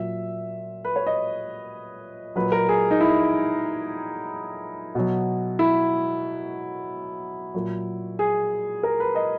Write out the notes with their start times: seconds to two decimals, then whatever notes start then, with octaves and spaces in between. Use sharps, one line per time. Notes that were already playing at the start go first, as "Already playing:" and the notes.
Already playing: A#2 F#3 E5
0.85 B4
0.96 C#5
1.07 D#5
2.36 A#2 F#3 B4
2.52 A#4
2.69 G#4
2.91 D#4
3.01 E4
4.95 B2 F#3
5.59 E4
7.54 A#2 F#3
8.19 G#4
8.83 A#4
9.00 B4
9.15 D#5